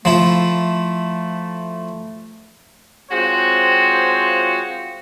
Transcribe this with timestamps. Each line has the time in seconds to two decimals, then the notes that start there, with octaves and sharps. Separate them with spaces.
0.05 F3 A3 E4
3.11 G#3 C4 F4 F#4 C5 C#5